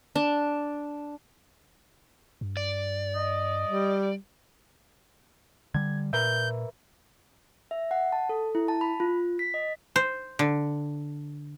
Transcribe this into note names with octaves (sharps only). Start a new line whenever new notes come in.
D4
G2
D5
D#5
G3
D3 G3 G#6
A#2 A#4 B4 E5 G6
E5
F#5
A5
A4
E4
A5
B5
F4
B6
D#5
C5
D3